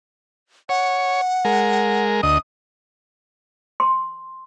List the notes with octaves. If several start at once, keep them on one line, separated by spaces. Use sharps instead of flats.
C#5 F#5
G#3 A#4
D2 D#5 D#6
C6